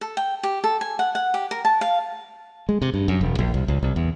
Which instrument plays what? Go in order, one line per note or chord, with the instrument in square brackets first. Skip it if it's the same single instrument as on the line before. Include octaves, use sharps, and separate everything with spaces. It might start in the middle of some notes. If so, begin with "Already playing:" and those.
[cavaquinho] A4
G5
G4
A4
G#5
F#5
F#5
G4
A#4
A5
F5
[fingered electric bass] G#3
C3
G2
F#2
E1
A#1
C2
C#2
C2
E2